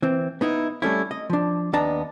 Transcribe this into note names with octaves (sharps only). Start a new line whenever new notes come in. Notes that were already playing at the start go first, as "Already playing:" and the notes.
E3 C4
B3 D#4 E4
G3 A3 C#4 E4
D#5
F3 D4
D#2 B3 D4 A5 A#5